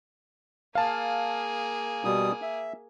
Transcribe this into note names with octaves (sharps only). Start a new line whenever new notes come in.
A#3 G#4 F5 A5
B2 G3 D#6
E5